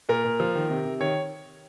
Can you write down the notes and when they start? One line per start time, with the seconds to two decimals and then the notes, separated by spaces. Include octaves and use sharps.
0.09 A#2 A#4
0.25 A#2
0.40 F3
0.55 D#3
0.70 C3
0.85 C3
1.00 D#3 C#5